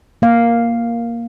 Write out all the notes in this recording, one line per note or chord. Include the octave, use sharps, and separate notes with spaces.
A#3 F5